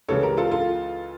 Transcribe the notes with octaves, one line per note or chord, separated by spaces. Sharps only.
C#2 C#3 E3 A4 C#5
G4 A#4
F4 A4
F4 A4